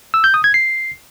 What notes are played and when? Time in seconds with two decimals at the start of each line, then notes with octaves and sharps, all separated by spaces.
0.14 E6
0.24 G6
0.34 D#6
0.44 G#6
0.54 C7